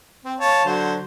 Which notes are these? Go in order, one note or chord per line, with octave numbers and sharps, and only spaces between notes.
C4
C#5 F5 A5
D3 F#3 C5